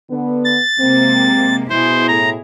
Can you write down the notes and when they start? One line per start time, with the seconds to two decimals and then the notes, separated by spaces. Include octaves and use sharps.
0.10 D3 B3
0.45 A6
0.80 C3 G#3 A#3 C4
1.70 B2 E4 G#4 C5
2.08 A2 A#5